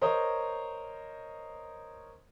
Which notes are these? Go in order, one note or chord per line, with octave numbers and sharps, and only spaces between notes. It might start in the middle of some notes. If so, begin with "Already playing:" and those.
A#4 C5 C#5 D#5